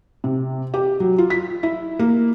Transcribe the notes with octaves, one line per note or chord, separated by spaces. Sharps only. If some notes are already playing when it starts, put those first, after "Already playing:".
C3
G4
F#3
F4
B6
E4
A#3